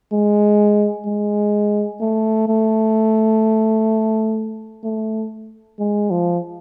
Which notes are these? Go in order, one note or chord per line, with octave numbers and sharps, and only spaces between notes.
G#3
G#3
A3
A3
A3
G#3
F3